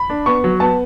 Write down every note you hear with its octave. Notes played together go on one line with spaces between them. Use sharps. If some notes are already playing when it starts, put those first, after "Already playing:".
Already playing: B5
D4
B3 C#6
F#3
B3 A5